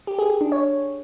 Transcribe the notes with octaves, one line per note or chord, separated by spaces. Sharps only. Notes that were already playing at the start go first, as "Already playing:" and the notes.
G4
G#4
G#4
D4
C#5